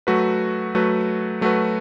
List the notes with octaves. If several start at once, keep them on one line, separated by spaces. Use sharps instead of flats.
F#3 A3 F#4 B4
F#3 A3 F#4 B4
F#3 A3 F#4 B4